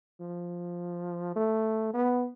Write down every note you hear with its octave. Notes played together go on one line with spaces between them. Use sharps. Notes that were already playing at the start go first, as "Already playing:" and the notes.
F3
A3
B3